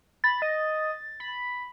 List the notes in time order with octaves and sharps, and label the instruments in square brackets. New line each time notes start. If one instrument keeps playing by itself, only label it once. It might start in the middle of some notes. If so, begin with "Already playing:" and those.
[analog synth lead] B5 [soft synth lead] A6
[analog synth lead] D#5
B5